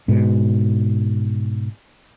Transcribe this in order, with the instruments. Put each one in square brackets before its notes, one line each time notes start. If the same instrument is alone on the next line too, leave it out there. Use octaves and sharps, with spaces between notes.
[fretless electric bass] G#2 B2